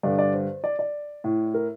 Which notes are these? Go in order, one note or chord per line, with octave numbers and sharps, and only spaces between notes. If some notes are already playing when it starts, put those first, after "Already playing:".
G2 D3 D5
D5
C5
D5
D5
A2
A#4